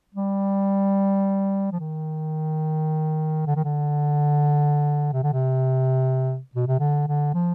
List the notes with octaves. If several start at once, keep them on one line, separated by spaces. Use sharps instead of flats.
G3
F3
D#3
D3
D#3
D3
C3
D3
C3
B2
C3
D3
D3
F3